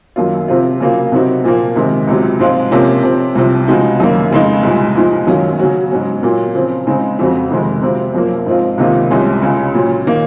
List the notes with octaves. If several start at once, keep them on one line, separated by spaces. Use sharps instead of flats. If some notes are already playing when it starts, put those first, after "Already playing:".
F#2 D#3 F#3 A#3 F4
C3 F3 C4 F4
C#3 F#3 A#3 F4
C3 F#3 C4 D#4 F#4
A#2 F3 A#3
C3 D#3 G#3
C#2 C3 F#3
G#2 F3 G#3 C4 F4
C3 F3 A#3 C#4
C3 F3 C4
C2 C3 F3
C#3 F3 G#3 D#4 F#4
F#2 D#3 A#3
F2 C#3 G#3 D#4
C2 A#2 G#3 D#4
A#2 F3 G#3 D#4
F#2 D#3 F#3 C#4 F4
C#3 F#3 C#4 F#4
G#2 F#3 C#4
A#2 F#3 A#3
C#3 F3 C4
C#3 G#3 C4 D#4
F2 C#3 F#3 C4 F#4
F2 C3 D#3 G#3
C3 F#3 C4 F4
F#2 F3 A#3
G#2 F3 C4 F4
C#2 C3 D#3 A#3 F4
C2 C3 F3 G#3 C#4
C#2 C#3 G#3
A#2 F#3 C#4
D#3 A#3